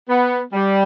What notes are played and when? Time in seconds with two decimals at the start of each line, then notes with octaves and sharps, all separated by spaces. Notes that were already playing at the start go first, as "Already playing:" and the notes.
0.09 B3
0.53 G3